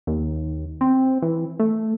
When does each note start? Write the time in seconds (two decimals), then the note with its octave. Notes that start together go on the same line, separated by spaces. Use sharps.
0.07 D#2
0.81 C4
1.22 E3
1.59 A3